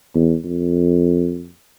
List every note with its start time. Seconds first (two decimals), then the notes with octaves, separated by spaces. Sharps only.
0.15 E2
0.44 F2